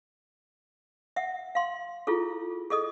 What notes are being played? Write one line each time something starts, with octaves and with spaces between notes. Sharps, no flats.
E5 F#5
F5 C6
E4 F4 G#4 A4
G#4 A4 D#5 D#6